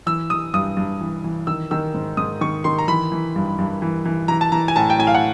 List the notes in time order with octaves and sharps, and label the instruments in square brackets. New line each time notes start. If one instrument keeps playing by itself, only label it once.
[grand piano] E3 E6
E3 D#6
G2 D#6
G2
E3
E3
D#3 E6
D#3 E6
G#2
G#2 D#6
D#3 C#6
D#3 C6
A#5
E3 B5
E3
G2
G2
E3
E3
E3 A#5
A5
E3 A#5
G#5
A2 A5
G5
A2 G#5
F5
F#5